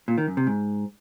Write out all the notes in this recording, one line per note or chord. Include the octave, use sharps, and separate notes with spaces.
A#2
D#3
F#2
C3
G#2